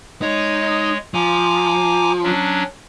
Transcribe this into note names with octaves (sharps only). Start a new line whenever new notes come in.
G#3 D#4 C#5
F3 G#5 A#5 D6
F#3 C#4 D4